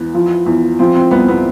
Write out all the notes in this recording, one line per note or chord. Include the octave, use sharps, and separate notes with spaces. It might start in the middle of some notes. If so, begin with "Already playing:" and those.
Already playing: E2 B3
F3
E2
F3 C4
C4
C2 B3
B3